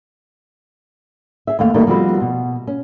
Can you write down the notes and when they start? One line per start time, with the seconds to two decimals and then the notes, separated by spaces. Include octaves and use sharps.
1.47 G#4 E5
1.59 D#2 A3 F5
1.74 D#3 G3 A3 A#3 D#4
1.87 F3 G3 B3 C4 F#4 B4
2.21 B2
2.67 C#4